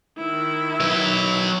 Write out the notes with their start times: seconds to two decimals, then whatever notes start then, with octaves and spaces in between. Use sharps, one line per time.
0.18 D#3 E4
0.80 F#3 B4